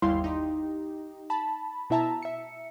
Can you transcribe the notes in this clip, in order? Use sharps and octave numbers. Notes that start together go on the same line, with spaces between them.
G1 D#2 G3 E4 F5 C6
D#4 G4
A5 B5
B2 E4 E5 A5 A#5
E5 C#7